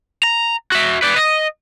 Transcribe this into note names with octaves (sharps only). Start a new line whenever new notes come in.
A#5
F#4 E5
B4 D5
D#5